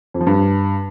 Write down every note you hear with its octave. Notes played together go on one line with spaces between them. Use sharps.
F2
F3
G2